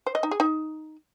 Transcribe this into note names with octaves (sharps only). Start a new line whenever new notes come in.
C5
D#5
D#4
G#4
D#4